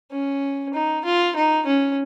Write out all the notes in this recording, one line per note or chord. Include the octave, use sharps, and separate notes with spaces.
C#4
D#4
F4
D#4
C#4